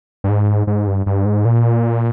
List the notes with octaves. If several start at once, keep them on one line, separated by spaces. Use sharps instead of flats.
G2
G#2
G#2
G2
G2
G#2
A#2